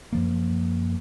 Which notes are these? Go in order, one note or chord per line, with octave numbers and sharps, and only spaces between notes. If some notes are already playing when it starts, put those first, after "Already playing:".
F#2 F3 A#3